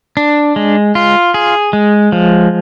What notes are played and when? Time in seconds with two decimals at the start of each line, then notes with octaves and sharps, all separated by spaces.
0.17 D4
0.56 G#3
0.95 F4
1.34 G#4
1.73 G#3
2.12 F3